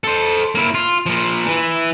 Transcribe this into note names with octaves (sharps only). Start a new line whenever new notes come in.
A4 C5
A#3 E4
F4
A#2 F3
E3